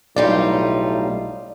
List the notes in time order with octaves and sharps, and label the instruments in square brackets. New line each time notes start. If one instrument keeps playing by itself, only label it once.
[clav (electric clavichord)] B1 [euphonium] A2 [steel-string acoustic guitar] G3 D#4 F4 [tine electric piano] D5